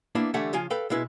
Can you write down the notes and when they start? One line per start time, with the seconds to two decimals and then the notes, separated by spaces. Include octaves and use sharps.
0.15 A#3 B3 D4 E4
0.34 D3 E3 G3 A3 E5 F#5
0.53 C#3 F3 F4 G#5
0.70 A4 B4 F5 G5
0.90 B2 G#3 E4 B4